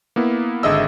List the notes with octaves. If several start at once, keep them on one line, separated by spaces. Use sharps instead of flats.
A#3 B3 E4
G#1 D3 G#4 D#5 E5 E6